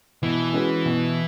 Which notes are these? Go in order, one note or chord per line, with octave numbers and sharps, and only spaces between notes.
B2 E3
G#3 C#4 F#4 B4
B2